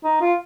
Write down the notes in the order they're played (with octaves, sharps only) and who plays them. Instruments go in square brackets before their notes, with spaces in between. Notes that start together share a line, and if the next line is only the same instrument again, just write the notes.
[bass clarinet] D#4
F4